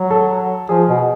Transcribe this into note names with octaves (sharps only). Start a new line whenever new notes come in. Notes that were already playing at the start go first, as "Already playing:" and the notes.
Already playing: F#3
A4
F3 G#4
B2